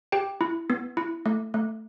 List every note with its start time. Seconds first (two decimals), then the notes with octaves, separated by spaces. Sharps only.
0.12 G4 G5
0.41 E4
0.70 B3
0.97 E4
1.26 A3
1.54 A3